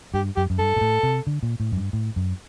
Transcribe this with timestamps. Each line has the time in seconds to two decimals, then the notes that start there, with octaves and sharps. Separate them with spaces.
0.14 G2 G4
0.36 F#2 G4
0.50 F#2
0.59 G2 A4
0.76 A#2
0.81 A2
1.03 C3
1.27 D3
1.43 A#2
1.60 A2
1.72 F#2
1.77 G2
1.93 A2
2.16 F#2